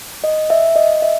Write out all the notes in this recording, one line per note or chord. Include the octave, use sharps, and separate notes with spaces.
D#5
E5
D#5
E5